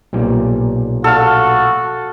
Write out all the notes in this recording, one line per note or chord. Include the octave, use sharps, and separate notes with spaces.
B1 A#2 G3
F#4 A4 F5